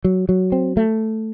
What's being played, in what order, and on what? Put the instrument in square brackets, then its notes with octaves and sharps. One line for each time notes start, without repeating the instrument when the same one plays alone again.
[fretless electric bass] F#3
F#3
C4
A3